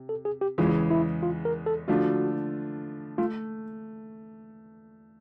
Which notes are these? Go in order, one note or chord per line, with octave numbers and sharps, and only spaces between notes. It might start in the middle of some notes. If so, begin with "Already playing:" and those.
Already playing: C3
A4
G#4
G4
E2 C#3 E3 G#3 F4
E4
F4
A#4
A4
D3 F3 A3 D4 F4 F#4
A3 F4